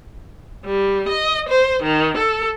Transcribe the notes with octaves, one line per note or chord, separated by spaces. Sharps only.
G3
D#5
C5
D#3
A4